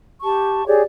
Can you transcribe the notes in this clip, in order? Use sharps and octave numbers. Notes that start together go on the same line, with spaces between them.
G4 A5 C#6
G4 G#4 C#5 D5